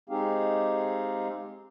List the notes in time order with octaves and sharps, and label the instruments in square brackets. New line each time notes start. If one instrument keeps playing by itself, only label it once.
[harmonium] G#3 C4 D#4 G4 G#4 F5